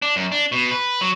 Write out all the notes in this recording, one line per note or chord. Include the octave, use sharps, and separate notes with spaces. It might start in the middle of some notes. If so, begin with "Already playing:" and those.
D4
F#2
D4
B2
B4
F#3